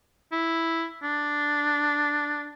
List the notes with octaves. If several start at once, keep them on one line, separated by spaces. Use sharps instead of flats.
E4
D4